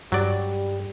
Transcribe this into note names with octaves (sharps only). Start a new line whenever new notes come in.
G2 F#3 G3 D5